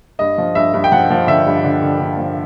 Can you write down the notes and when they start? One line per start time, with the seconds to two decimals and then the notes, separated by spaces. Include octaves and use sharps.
0.19 G2 D#5
0.38 F3
0.55 G2 E5
0.74 G2
0.84 G5
0.92 F3 F#5
1.10 F3
1.27 D3 E5
1.47 G2
1.64 D3
1.82 D3
2.01 D3
2.18 F3